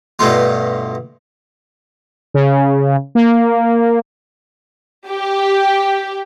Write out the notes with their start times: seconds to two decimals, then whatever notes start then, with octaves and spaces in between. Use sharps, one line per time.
0.19 G2 B2 A3 F4
2.34 C#3
3.15 A#3
5.08 G4